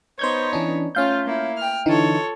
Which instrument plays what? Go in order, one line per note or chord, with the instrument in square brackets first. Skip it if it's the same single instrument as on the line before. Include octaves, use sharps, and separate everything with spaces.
[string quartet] B3 D#4 C#5 [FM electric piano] C5 G6 G#6
[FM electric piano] E3 C#4 D4
[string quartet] A3 F4 [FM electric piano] C#4 F5 G6
[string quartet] A#3 E4
G5 F6
[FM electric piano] D3 E3 D#4 [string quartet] F4 A4 C#5